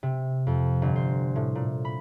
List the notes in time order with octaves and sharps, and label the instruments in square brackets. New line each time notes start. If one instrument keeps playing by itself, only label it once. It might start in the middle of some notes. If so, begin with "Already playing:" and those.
[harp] C3
F2
G1
C5
A2
A#2
B5